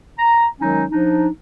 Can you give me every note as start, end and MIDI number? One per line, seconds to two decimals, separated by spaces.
0.18 0.47 82
0.60 0.85 51
0.60 0.85 54
0.60 0.85 56
0.60 0.85 61
0.60 0.85 63
0.91 1.28 53
0.91 1.28 62
0.91 1.28 63